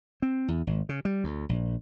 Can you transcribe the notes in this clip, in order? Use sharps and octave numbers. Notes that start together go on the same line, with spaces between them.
C4
E2
G#1
C#3
G3
D2
A#1